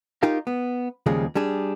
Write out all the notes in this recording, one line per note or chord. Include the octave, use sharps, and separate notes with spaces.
D#4 F4 G4 A#4 F5
B3
D#2 C#3 F3 G3 G#3
G3 D4 G#4